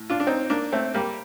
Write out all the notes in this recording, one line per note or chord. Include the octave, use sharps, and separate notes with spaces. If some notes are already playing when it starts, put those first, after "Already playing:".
Already playing: A2
D4 F4
D4
C4 D#4
A#3 D4
A3 C4
G3 A#3